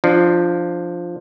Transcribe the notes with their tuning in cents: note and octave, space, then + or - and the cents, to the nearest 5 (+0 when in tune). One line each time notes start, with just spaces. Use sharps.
F3 +0 D4 +20